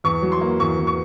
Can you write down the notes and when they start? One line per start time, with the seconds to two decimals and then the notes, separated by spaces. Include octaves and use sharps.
0.04 E2 C#6
0.22 F#3
0.32 C6
0.41 A#3
0.60 E2 C#6
0.79 E2
0.87 C#6